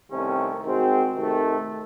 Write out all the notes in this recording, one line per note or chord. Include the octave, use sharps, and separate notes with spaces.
C2 C3 D#3 A3 C#4
D#3 G#3 C4 F#4 C5
C3 D#3 A3